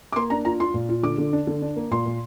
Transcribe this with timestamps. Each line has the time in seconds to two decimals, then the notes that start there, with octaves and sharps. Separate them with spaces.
0.12 D6
0.16 A#3 C6
0.30 D4 A#5
0.45 F4 A#5
0.60 F4 C6
0.74 A#2
0.89 F4
1.03 D3 D6
1.18 D3
1.33 D4
1.47 D3
1.62 D4
1.76 A#3
1.91 A#2 C6
2.06 A#2